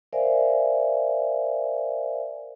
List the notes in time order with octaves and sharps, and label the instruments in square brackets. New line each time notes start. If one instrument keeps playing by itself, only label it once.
[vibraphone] A#4 C5 D5 E5 F5 G#5